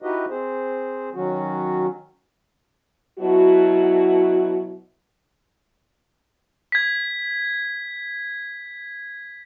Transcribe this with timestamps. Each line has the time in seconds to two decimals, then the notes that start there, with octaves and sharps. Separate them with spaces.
0.02 D#4 E4 F#4 G4 B4 D#5
0.30 C4 G#4 C5
1.15 D#3 F#3 C#4 F#4
3.19 B2 F#3 E4 F#4
6.72 G#6 B6